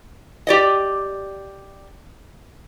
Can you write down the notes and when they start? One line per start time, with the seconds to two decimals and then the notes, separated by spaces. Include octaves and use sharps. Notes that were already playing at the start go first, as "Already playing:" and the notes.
0.47 G4 D5 D#5